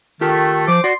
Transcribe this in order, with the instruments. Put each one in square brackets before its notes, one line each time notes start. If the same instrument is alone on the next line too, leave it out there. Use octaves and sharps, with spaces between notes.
[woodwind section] D#3 A3 [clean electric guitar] F4 G4 A4
[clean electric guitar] F3 [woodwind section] C5 D6
[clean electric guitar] F#4 [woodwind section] D5 C6